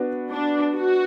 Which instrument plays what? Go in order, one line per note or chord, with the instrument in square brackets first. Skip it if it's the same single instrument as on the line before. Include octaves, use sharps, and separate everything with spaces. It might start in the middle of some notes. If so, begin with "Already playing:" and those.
Already playing: [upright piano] B3 D4 F#4
[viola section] D4
F#4